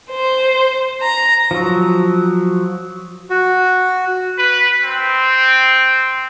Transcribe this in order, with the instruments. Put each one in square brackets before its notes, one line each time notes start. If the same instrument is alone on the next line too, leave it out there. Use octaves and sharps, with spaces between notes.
[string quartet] C5
A#5
[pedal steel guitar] F3 F#3
[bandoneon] F#4
[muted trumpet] B4
C4